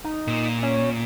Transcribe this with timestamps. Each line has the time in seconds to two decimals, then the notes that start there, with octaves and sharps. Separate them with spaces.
0.04 D#4
0.27 A#2
0.63 C#4